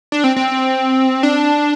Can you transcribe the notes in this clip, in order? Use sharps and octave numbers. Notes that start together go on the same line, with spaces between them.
D4
C4
C4
D4